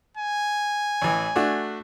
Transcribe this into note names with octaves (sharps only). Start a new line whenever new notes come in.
G#5
A1 E3
A3 D4 F#4